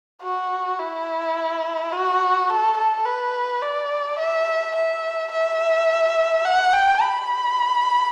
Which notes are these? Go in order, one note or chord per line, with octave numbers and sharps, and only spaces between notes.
F#4
E4
F#4
A4
A4
B4
D5
E5
E5
E5
F#5
G5
B5